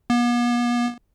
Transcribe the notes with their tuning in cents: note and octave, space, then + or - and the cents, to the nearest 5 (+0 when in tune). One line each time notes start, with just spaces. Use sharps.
B3 -45